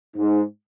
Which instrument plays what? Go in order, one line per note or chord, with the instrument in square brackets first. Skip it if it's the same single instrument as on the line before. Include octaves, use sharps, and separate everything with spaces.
[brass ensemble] G#2